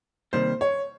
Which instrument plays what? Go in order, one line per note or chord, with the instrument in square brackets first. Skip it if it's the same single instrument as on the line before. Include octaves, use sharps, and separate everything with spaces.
[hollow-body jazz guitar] C3 D#3 G3 A#3 [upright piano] C5
[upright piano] C#5